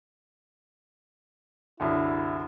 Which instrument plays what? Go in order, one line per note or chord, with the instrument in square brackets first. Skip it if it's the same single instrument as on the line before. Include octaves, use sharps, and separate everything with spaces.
[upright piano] C2 F#2 D3 [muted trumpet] E4